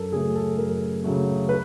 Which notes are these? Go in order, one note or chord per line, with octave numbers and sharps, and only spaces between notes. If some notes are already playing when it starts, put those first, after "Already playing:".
Already playing: F#2 A4 A#4
C#3 F#3 A3 G#4
A4
F#2 A#4
C#3 F#3 A3
B4